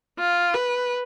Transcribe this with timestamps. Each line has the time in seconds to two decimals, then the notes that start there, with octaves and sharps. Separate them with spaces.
0.19 F4
0.54 B4